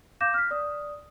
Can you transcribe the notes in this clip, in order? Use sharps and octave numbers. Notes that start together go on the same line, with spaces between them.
F5 D6 G6 A#6 E7
F6 B6
D5 D#6